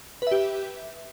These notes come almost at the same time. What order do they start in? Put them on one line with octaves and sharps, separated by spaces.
B4 E5 G4